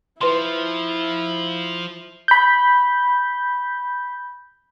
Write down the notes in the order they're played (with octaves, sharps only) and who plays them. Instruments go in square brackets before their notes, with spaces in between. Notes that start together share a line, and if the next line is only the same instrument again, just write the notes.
[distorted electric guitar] F3 [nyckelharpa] E4 [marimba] B4 C6
[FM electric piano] B5 G6